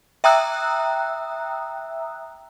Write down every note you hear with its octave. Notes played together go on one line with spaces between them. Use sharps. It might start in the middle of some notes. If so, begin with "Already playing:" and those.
E5 G5 A#5 D#6 E6 F#6